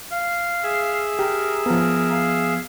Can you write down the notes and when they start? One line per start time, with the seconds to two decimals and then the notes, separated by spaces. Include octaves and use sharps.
0.12 F5
0.63 G#4 E5
1.19 G4 A#4
1.66 F3 B3 A#4
2.11 F5